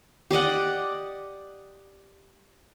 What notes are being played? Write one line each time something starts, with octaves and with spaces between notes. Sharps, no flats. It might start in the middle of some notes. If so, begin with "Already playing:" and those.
G4 D5 D#5 F#5